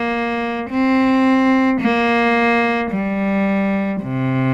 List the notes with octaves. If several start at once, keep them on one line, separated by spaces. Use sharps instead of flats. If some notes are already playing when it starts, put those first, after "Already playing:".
Already playing: A#3
C4
A#3
G3
C3